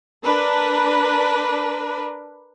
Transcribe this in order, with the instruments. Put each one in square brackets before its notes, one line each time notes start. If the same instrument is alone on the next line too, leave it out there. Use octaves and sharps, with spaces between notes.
[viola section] D4 A#4 B4